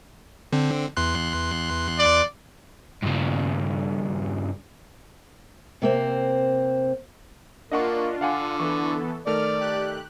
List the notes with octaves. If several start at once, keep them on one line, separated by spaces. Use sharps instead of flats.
D3 C4
E2 C6 F#6
D5
G2 C#3
C3 A#3 C4
A#3 D4 F4 D#5 F#5 C#6
D3 F5 F#5 G#5
E3 B3 A4 C#6
D#3 A3 A#4 D5 F6
G4 F#6